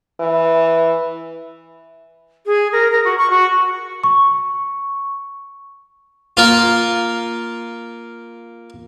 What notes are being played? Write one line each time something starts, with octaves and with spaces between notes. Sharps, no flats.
E3
G#4
A#4
A#4
F#4
C#6
F#4
C#6
A#3 F4